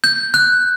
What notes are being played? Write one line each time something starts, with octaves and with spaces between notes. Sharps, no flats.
G6
F#6